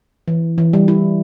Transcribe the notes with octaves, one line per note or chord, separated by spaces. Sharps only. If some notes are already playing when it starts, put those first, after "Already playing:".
E3
E3
G3
E4